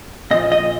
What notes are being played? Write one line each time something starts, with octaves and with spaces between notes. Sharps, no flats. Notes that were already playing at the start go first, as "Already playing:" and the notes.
A#2 F3 D#5
D#5